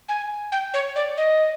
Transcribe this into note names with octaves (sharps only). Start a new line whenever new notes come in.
G#5
G5
C#5
D5
D#5